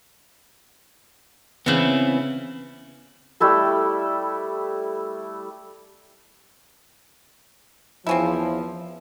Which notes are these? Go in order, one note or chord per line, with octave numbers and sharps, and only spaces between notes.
C#3 E3 B3 C4 E4
G3 A3 E4 A4
E2 F3 C4 C#4 E4